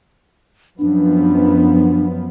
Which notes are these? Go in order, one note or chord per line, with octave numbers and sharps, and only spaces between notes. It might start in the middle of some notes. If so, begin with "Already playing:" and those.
F#2 F3 B3 D4